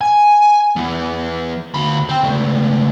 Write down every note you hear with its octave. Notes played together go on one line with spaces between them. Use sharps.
G#5
E2 E3
D2 B5
C4 G5
C#2 A3